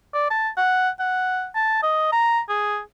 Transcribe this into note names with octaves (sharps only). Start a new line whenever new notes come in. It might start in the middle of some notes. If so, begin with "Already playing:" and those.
D5
A5
F#5
F#5
A5
D#5
A#5
G#4